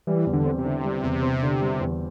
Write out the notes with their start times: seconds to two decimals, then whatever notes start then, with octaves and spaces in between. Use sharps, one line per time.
0.07 E3 G3
0.26 E2
0.33 D3
0.45 C4
0.58 C3
0.65 D3
0.84 G3
1.03 E2
1.23 C4
1.43 D3
1.61 G3
1.81 E2